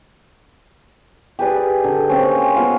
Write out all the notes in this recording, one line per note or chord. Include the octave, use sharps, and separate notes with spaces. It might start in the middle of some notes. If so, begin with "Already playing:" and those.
G4 G#4 B4 D5
D3
A#3 C4 C#4
A#3 B3 F4